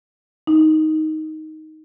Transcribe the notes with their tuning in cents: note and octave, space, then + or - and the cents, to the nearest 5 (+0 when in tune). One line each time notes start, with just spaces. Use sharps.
D#4 +10